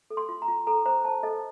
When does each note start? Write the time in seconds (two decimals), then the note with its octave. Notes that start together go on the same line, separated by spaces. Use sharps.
0.10 A4
0.17 C6
0.29 F4
0.42 A#5
0.48 F4
0.67 A4 A#5
0.86 C5 A#5
1.05 C5 A5
1.23 A4 D#5